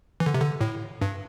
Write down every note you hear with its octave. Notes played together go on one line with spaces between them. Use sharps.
E3
D3
C3
D3
A2
G2